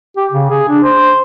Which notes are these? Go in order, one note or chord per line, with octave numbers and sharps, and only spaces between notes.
G4
C#3
G#4
D4
C5